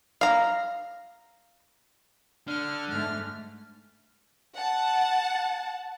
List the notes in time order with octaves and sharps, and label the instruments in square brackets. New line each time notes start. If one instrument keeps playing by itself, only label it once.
[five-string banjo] F5 A#5
[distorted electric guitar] D3 [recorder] F6
[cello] G#2 A3 [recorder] F6
[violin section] F#5 A5